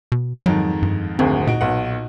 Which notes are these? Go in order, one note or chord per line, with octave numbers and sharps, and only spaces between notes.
B2
F2 G#2 D#3 F#3
G2
G#1 D2 C4 G#4
A#2 D#4 F#4 D7
B1 F#5